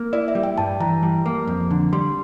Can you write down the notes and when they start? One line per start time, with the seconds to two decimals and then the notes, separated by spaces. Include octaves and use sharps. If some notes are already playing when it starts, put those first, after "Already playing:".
Already playing: A#3
0.13 E4 D5
0.28 E5
0.35 G3
0.44 G5
0.58 G2 A5
0.80 E3 A#5
1.03 G3
1.26 A#3
1.47 F2
1.71 D3
1.93 G3 C6